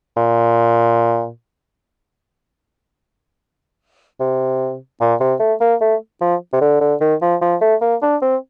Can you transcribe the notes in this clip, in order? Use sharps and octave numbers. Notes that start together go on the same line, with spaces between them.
A#2
C3
A#2
C3
A3
A#3
A3
F3
C3
D3
D3
D#3
F3
F3
A3
A#3
D4
C4